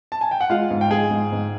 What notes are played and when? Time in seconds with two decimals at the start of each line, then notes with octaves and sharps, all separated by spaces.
0.12 A5
0.21 G#5
0.31 G5
0.41 F#5
0.49 G#3 F4 F5
0.71 G#2
0.81 G5
0.91 G#2 G#4 G#5
1.11 G#2
1.32 G#2